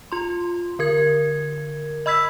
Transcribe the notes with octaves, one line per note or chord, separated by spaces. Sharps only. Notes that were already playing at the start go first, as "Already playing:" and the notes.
F4 C6
D3 A#4 G#6
D#5 B5 E6 G#6 B6